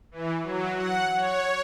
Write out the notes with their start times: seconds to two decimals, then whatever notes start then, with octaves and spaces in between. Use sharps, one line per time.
0.11 E3
0.43 F#3
0.75 F#5
1.16 C#5